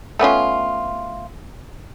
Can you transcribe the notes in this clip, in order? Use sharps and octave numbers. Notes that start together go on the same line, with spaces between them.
A3 B3 C#4 F4